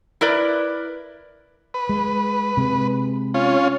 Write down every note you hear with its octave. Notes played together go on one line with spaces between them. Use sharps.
E4 A#4 B4 D5
B4
G#3
C3 G#3
C#4 F4